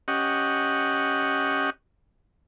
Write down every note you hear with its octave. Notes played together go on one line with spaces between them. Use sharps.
C#4 G4 D#5 F#5